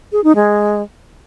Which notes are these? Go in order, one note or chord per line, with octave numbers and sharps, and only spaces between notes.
G#4
D#4
G#3